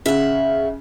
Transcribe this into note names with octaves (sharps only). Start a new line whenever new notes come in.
C#3 E5 F#5